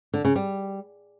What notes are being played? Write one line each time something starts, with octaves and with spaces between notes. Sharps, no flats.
D3
C#3
G3